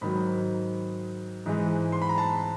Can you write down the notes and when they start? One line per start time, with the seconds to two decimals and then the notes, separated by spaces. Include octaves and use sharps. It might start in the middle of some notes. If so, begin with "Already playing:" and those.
0.01 G#2 D#3 F#3 B5
1.46 G#2 E3 G#3
1.92 C6
2.02 B5
2.09 A#5
2.18 A5